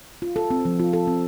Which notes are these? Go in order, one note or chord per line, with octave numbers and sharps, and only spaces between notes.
F4
A4
C4
F3
F4
A4
C4